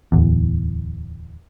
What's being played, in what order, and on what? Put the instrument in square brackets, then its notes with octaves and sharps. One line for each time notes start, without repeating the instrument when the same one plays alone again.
[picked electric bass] D1 E2